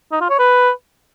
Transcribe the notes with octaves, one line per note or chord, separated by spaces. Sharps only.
D#4
F4
C#5
B4